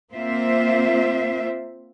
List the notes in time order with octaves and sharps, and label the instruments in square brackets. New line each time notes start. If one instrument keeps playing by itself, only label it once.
[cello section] A#3 C4 F4 C5 E5